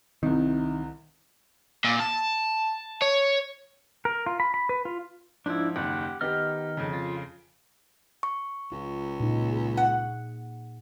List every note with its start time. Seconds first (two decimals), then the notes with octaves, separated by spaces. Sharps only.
0.23 C2 C3 D#3
1.84 A#2
2.00 A5
3.02 C#5
4.05 A#4
4.26 F4
4.40 B5
4.54 B5
4.69 B4
4.85 F4
5.46 G#2 F3 D4 E4
5.76 F#1 D#2 G4 F#5
6.21 D#3 B3 G4 D#5 F6
6.77 F2 C#3
6.93 F4
8.23 C#6
8.72 C#2 F4
9.20 A#2 D#4
9.53 G#4
9.77 F#5